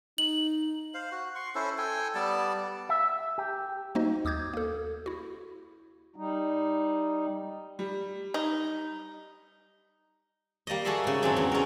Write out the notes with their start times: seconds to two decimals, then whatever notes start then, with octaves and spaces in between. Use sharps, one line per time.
0.18 D#4 F#7
0.94 C5 F5
1.12 F#4
1.35 C6 C#6
1.55 C#4 E4 A4 C5
1.78 A4 G5 G#5
2.15 G3 B3 D5 A5
2.89 E5
3.38 G4
3.95 G3 A#3 D#4 F#4 C5 D#5
4.25 D#2 D6 D#6 G6 G#6
4.53 A#3 A4
5.06 E4 F#4
6.16 G3 D#4
7.79 G3
8.34 D#4
10.67 G3 A#3 D5 D#5
10.85 F#4 G#4 A4 D5 E5 C6
11.04 G#2 C#3
11.23 F#3 G#3 C4 D4
11.37 E2
11.52 C#4 A#4